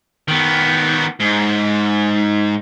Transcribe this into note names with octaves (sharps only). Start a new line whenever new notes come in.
D#3 B3
G#2